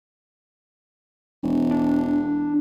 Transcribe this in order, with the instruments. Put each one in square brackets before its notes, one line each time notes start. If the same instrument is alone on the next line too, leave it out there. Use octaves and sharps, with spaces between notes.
[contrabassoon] E1
[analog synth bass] D4